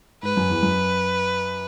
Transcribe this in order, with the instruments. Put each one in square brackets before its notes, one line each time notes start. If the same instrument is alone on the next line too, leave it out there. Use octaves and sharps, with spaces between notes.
[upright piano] G#2 [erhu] B4
[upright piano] F#2
E2
F#2